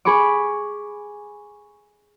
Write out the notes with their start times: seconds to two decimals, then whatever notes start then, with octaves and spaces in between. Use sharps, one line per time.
0.05 G#4 B5 C#6 D6